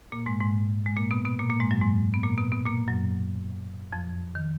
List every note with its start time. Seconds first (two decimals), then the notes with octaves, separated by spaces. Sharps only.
0.12 A#2 A#3
0.26 G#2 G#3
0.40 G#2 G#3
0.86 G#3
0.97 A#2 A#3
1.11 B2 B3
1.25 B2 B3
1.39 A#2 A#3
1.50 A#2 A#3
1.60 G#2 G#3
1.71 F#2 F#3
1.81 G#2 G#3
2.14 B3
2.24 A#2 A#3
2.38 B2 B3
2.52 B2 B3
2.66 A#2 A#3
2.87 F#2 F#3
3.92 F2 F3
4.35 D#3